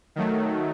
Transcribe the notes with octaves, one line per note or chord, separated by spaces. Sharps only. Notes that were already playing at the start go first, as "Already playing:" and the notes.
D#3 F#3 A3